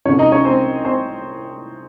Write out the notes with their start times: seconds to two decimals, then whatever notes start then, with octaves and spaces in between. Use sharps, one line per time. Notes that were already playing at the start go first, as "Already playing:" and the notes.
0.05 C2 C3 F3 C#4 C#5
0.19 D#4 D#5
0.32 C#4 C#5
0.45 C4 C5
0.85 C4 C5